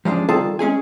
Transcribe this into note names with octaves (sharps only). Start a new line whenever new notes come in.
F3 G3 G#3 C#4 D4
D#3 G3 F4 G#4 A4 A5
G#3 C#4 G#4 G#5